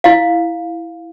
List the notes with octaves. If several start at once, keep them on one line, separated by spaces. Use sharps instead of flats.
E4 F5